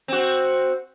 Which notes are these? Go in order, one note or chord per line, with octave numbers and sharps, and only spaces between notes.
C4 F#4